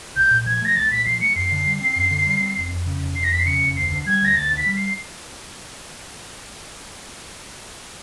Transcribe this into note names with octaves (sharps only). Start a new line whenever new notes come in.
C2 G6
A#2
F3 G#6
A3 A#6
C2 A6
A#2 B6
F3 C7
A3 C#7
F#2 C7
D3
G3
C4
F#2
D3
G3
C4
F1
F2
C#3
F1
F1 C7
A#6
F2 B6
C7
C#3 C#7
F1
D2 C7
D3
G3 G#6
D2 A#6
D2 A6
D3
B6
G3
C7